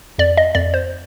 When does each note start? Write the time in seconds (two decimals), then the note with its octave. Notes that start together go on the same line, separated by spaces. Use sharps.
0.18 F2 D5
0.37 D#5
0.55 F2 D5
0.74 C5